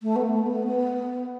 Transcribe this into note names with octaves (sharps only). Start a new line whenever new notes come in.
A3
B3
A3
B3
B3